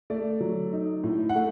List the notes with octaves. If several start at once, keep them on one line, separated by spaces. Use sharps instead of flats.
A3 D5
F#3
D#4
A2
F#5
A3